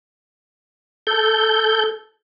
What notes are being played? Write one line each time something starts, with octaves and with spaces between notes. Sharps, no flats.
A4 G6